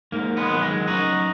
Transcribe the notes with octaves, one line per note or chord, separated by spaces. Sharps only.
G#2 A#3
G#3 B3
D#3 F#3
G#3
F#2 D#4 F#4